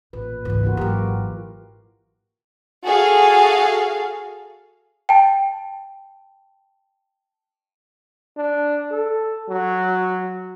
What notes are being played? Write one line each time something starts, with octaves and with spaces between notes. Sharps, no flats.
A1 A#2 B4
G#1 C#2 E3 B4
A#3 F4 F#4
G#1 F#3 G4 A#4
F#4 G#4 A4 F5
G5 A5
D4
A4
F#3